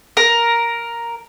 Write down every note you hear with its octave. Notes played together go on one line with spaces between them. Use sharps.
A#4